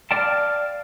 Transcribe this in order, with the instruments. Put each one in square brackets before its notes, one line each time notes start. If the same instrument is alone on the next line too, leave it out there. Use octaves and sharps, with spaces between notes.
[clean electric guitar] D5 G5 A5 [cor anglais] F5